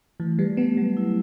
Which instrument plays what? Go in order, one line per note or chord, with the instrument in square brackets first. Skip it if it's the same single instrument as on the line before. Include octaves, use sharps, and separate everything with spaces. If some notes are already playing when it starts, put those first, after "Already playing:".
[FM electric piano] E3 [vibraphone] A3
[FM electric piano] G3 [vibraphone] B4
[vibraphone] A3 [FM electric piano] B3
[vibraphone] F#3 [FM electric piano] G3
[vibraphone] E4